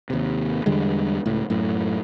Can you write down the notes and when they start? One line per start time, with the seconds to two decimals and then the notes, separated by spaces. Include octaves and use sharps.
0.10 D#2 C3
0.66 E2 D3 G3 G#3
1.26 C#2 A2
1.50 F#2 A2